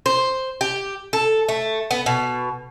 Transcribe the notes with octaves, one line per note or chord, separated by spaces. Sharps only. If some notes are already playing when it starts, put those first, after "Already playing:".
C5
G4
A4
A3
B3
B2